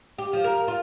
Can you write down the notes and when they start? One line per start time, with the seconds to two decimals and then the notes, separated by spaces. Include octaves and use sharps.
0.18 G4
0.33 F3
0.44 A#4
0.68 F4